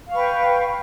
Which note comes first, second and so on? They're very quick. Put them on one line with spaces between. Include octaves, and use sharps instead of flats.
F5 C#6 B4 G5